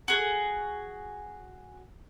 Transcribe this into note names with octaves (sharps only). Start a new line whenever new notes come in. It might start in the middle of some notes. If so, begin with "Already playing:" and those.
F#4 G#4